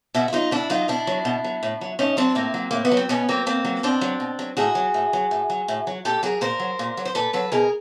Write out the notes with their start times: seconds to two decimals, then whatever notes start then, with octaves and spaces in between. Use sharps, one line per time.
0.14 B2 E4 F#4
0.28 E4
0.33 F#3 D#4 F4
0.51 B2 D4 E4
0.70 F#3 D#4 F4
0.88 B2 D4 E4
1.07 F#3
1.25 B2
1.44 F#3
1.63 A2
1.81 F#3
1.99 A2 C#4 D#4
2.17 F#3 C4 D4
2.35 A2 A#3 C4
2.54 F#3
2.71 A2 A#3
2.85 B3
2.92 F#3
2.97 C4
3.09 B2 B3 C#4
3.29 F#3 A#3 C4
3.46 B2 A#3 C4
3.65 F#3
3.83 B2 C4 D4
4.01 F#3
4.20 B2
4.39 F#3
4.57 A2 F#4 G#4
4.75 F#3
4.94 A2
5.13 F#3
5.31 A2
5.50 F#3
5.68 A2
5.87 F#3
6.05 A#2 G4 A4
6.23 F#3 G#4 A#4
6.41 A#2 A#4 C5
6.60 F#3
6.79 A#2
6.97 F#3
7.05 C5
7.15 A#2 A4 B4
7.33 F#3 A4 B4
7.52 B2 G#4 A#4